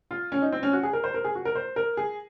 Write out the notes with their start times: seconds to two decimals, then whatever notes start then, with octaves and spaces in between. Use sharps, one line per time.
0.11 F4
0.32 C#4
0.42 D#4
0.52 C4
0.63 C#4
0.73 F#4
0.83 G#4
0.93 A#4
1.04 C5
1.14 A#4
1.24 G#4
1.35 F#4
1.45 A#4
1.55 C5
1.76 A#4
1.97 G#4